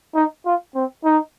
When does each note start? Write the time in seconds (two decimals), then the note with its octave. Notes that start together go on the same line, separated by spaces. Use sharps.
0.15 D#4
0.46 F4
0.75 C4
1.04 D#4